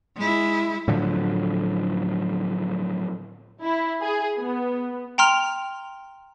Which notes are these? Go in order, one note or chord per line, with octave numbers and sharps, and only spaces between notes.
G#3 E4
A2 D3 F3 F#3
E4
G#4
B3
G5 A#5 C6 F6 F7